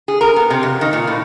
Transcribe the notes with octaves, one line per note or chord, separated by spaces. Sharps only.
G#4
A#4
B3
C3
F2
D#3
A#2
A2